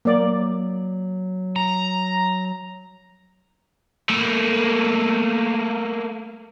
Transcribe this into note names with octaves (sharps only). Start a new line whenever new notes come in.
F#3 A#3 D5
A#5
A3 A#3